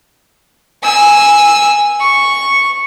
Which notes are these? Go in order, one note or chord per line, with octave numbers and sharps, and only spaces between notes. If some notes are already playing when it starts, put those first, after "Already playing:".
G#5 E6
C#6